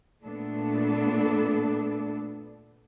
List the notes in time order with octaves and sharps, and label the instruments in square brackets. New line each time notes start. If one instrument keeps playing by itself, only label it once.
[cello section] A#2 A3 B3 D4 A4